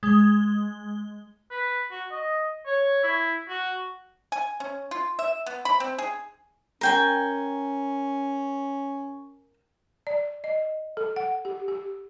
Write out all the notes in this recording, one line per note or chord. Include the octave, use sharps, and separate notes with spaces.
G#3 G7
B4
F#4
D#5
C#5
E4
F#4
G#5
C#4
F4
E5
B3
B5
C4
G#4
C#4 A#4 G5 G#5
D5
D#5
A4
F#5
G4
G4